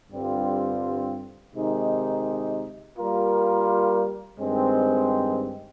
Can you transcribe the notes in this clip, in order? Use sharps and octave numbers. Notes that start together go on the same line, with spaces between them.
G2 D3 G3 C4 F4
C3 D#3 G#3 D#4
G3 A#3 F4 A#4
G2 D#3 G#3 C4